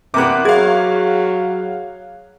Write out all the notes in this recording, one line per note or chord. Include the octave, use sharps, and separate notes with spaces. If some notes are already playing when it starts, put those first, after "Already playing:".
E2 C3 A#3 B3 D6 F#6
F#3 G#4 F5 G#6